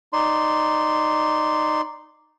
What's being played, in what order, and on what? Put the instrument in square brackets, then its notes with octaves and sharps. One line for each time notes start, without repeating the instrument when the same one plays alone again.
[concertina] D#4 D5 C6